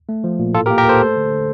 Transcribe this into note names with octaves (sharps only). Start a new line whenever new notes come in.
A3
F3
A#2
A2 F4 A4
G4 A#4
A#3
G4 A#4
A#3 A4 C5
A3
D3
D3